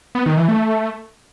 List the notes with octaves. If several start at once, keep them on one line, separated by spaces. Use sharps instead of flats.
B3
D#3
E3
A3